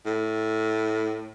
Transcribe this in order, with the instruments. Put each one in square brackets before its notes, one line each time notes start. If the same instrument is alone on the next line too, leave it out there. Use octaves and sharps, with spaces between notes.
[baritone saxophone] A2